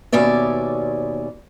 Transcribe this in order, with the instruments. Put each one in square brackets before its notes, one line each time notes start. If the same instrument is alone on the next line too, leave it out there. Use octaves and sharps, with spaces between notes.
[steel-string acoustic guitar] D#2 B2 C#4 D5 E5